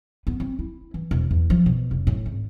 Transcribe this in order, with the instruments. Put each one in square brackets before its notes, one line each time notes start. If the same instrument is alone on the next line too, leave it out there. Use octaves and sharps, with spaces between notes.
[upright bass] B3
C4
E4
E3
E1
E2
F3
B2
F1
A2
G#1